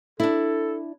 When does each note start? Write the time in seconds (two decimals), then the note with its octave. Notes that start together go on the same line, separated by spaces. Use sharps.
0.20 D4 E4 A4